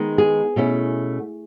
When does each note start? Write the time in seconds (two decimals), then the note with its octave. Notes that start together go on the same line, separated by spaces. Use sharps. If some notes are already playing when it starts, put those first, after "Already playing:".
Already playing: D#3 G#3 B3 D#4
0.18 G#4
0.56 B2 A3 C#4 E4